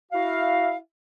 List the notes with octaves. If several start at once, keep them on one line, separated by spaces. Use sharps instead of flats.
E4 F#4 F5